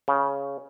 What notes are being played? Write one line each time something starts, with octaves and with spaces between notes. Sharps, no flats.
C#3